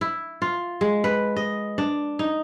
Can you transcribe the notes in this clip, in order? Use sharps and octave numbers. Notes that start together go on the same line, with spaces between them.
E4
F4
G#3
B4
D#5
D4
D#4